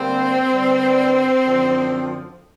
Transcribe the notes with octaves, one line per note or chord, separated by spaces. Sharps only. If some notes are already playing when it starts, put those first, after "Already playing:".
Already playing: D3 G3 A#3 C4
G2 D3 G3
F#2 D3 F3